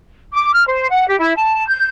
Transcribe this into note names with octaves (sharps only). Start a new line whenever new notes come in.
D6
F6
C5
F#5
G4
E4
A5
G6